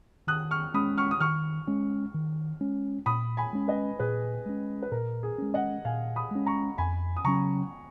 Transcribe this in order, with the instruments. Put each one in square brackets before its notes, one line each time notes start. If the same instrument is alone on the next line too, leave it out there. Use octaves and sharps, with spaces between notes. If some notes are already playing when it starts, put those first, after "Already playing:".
[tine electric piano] D#3 [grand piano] D#6 F#6
[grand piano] C#6 F6
[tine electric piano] G#3 C#4 [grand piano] B5 D#6
[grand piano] C#6 F6
D#6
[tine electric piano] D#3 [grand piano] C#6 F6
[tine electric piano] G#3 C#4
D#3
G#3 C#4
[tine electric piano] A#2 [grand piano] B5 D#6
[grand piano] G#5 B5
[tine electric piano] G#3 C#4
[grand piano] B4 D#5
[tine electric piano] A#2 [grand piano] G#4 B4
[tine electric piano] G#3 C#4
[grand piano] B4
[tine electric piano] A#2 [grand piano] A#4
[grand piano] G#4
[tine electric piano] G#3 C#4
[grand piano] D#5 F#5
[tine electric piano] A#2 [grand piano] F5 G#5
[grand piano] B5 D#6
[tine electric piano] G#3 C#4
[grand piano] A#5 C#6
[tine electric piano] F2 [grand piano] G#5 B5
[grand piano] D#6
[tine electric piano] C#3 F#3 C#4 [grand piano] A#5 C#6